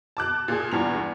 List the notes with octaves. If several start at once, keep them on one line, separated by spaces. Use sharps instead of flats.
A5 D6 F#6
A#2 G#4
E2 G2 F7